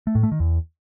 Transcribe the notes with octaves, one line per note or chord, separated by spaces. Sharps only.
A3
A2
A3
D#3
E2